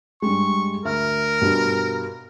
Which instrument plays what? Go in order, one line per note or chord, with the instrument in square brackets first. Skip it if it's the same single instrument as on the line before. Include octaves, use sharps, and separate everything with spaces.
[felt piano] G2 G3 G#3 [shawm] C#6
[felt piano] D2 E5 F6 [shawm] A#4
[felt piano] G2 B2 G4